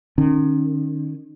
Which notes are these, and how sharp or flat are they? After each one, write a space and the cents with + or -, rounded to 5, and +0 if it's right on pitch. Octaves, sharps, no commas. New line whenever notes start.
D#3 -35 C#4 -25